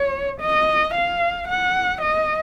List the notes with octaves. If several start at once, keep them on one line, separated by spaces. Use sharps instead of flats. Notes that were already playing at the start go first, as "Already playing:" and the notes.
Already playing: C#5
D#5
F5
F#5
D#5